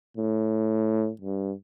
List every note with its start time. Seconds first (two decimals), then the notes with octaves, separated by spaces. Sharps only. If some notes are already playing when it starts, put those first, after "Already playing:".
0.17 A2
1.21 G2